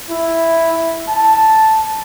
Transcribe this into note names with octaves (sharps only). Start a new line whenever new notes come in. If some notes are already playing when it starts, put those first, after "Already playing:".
E4
A5